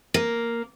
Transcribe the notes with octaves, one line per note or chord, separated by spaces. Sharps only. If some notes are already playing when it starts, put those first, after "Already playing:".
A#3